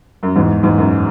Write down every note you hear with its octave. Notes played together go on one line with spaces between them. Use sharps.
F#2
E2 G#2
E2 G#2
F#2